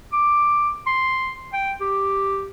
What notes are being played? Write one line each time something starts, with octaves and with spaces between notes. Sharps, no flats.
D6
C6
G5
G4